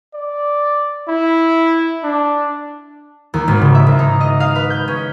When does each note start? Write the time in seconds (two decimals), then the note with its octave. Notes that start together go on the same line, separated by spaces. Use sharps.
0.14 D5
1.08 E4
2.04 D4
3.34 D#2
3.48 G#1
3.61 C#3
3.75 E5
3.87 G#1
3.99 D#4
4.21 D#5
4.40 F5
4.55 B4
4.70 G6
4.88 C#4